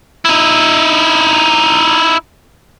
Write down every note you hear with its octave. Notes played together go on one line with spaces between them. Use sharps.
D#4 E4